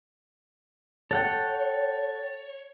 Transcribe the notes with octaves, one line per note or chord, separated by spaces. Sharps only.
A4 C#5 F#5 G5